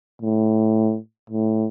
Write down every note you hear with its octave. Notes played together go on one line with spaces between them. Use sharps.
A2
A2